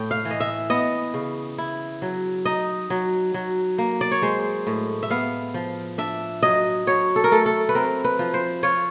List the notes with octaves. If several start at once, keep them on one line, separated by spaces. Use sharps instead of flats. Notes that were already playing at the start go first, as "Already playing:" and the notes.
Already playing: A2 G5
F5
E3
D#5
E5
B3 D#5
C#3
E4
F#3
D#4 D#5
F#3
F#3
A#3
D5
C#5
G#3 C5
A2
E5
B3 F5
F3
D4 E5
F#3 D#5
F#3 C#5
A4
A#4
A3 A4
A4
B4
C4 A#4
B4
F3
C5
F4 C#5